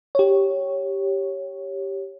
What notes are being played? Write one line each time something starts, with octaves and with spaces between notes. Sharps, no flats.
G4 C#5